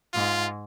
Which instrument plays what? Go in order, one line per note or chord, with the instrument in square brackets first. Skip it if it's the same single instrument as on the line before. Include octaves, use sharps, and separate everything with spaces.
[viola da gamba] G#2 [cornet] F4